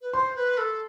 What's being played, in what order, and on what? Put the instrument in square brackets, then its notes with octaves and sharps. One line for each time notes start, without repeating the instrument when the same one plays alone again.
[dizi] B4
[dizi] C5 [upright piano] C6
[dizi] B4
A4